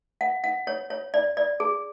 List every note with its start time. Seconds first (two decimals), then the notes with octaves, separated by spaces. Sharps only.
0.21 F#5
0.44 F#5
0.67 C#5
0.90 C#5
1.14 D5
1.37 D5
1.60 G#4